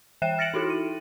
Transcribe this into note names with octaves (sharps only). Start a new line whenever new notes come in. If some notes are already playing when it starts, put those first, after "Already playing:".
E3 E5 G5 F#6 E7
F6 A6 A#6 C#7 D7 F#7
D#4 E4 F#4 A4
D#7